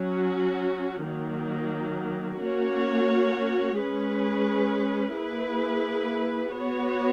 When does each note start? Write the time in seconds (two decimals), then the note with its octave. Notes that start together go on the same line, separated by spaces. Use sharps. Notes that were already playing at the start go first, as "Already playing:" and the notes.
Already playing: F#3 C#4 F#4
1.06 D#3 F#3 A#3
2.42 A#3 C#4 F#4 C#5
3.79 G#3 C#4 G#4 B4
5.16 A#3 E4 G#4 B4
6.51 B3 F#4 C#5